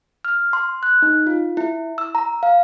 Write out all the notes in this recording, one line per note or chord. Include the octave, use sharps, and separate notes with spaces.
F6
C6
F#6
D#4
F4
E4
E6
A#5
F5